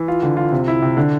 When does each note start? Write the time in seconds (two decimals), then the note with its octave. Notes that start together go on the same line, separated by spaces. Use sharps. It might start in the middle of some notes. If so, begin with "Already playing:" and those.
Already playing: E3
0.08 F4
0.22 D3
0.37 F4
0.52 C3
0.68 E4
0.82 C3
0.97 D3